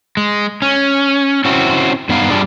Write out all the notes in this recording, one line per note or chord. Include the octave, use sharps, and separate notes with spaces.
G#3
C#4
C4 C#4 E4 F#4
G2 B3 D#4 F5
G3 D4 F4 G#4 D5